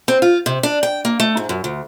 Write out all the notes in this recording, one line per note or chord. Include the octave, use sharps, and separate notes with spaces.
C4
F4
C3
D4
G5
A#3
A3
G#2
F#2
D2